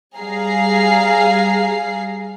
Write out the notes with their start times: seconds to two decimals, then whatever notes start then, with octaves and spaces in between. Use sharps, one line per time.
0.17 G3 G#4 F5 A#5 C7